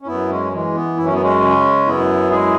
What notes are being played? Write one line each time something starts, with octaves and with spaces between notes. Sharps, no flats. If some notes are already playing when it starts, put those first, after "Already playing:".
C#4
F#2 B3 E4
G#3 C#4
E3 G#3
B3
F#2 E4
C#4
B3
G#3 C#4
C#3
F#2 B3 E4
G#3 E4 G#4